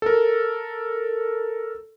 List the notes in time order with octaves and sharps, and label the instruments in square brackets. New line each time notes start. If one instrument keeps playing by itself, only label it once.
[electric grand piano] A4 A#4